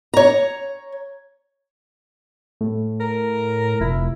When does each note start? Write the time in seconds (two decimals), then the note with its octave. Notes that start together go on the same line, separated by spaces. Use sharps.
0.14 C#5 A#5
2.61 A2
3.00 A#4
3.81 F1 E4